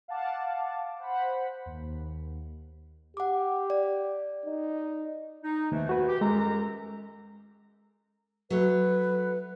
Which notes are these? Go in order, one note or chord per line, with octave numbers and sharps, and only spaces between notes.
F5 F#5 A5 D6
C5 F#5 B5
D#2
G4 F#5 D6
D5
D#4
D#4
D#2 E3 F3 A3
F#4 B4
G4
F#2 G#3 A4 A#5
F#3 A3 B4